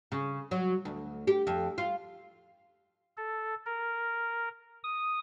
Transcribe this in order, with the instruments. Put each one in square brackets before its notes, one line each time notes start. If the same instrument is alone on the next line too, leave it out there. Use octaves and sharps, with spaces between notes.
[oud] C#3
F#3
D2
G4
F2
F4
[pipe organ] A4
A#4
D#6